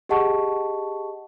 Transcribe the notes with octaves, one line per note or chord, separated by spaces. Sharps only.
G4 G#4 D#5 F#5 A5 C#6